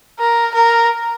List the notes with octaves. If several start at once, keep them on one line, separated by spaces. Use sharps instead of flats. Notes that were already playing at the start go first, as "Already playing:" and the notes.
A#4
A#4